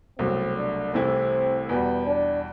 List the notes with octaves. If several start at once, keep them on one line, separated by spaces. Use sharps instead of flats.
C2 B2 F#3 A3 C4
D4
C2 C3 E3 A3 C4 E4
E2 B2 G3 B3
D4